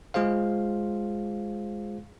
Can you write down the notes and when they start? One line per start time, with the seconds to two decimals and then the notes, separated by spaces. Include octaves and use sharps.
0.14 G#3 F4 G#4 C5 F5